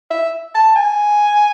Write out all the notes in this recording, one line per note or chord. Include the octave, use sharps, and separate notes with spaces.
E5
A5
G#5